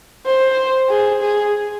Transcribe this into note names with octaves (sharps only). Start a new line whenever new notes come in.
C5
G#4
G#4